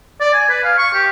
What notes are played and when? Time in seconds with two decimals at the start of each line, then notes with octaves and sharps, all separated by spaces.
0.21 D5
0.34 G#5
0.50 B4
0.64 F5
0.78 C#6
0.94 G4